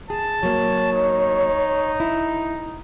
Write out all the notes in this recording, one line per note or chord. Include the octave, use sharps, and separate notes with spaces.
G#4 A5
F#3 A#3 C#5
D#4
E4